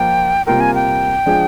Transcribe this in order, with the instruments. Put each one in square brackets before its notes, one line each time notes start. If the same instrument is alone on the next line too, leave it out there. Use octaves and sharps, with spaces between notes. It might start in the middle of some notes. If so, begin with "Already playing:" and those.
Already playing: [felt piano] F3 A#3 F4 [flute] G5
[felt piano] C3 G3 A#3 F4 A#4 [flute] G5
[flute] G#5
G5
[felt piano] F3 G#3 D4 F4 G#4